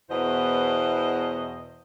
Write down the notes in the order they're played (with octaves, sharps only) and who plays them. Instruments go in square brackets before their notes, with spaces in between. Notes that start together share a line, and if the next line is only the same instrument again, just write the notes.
[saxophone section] E2 B2 B3 E4 C5 D#5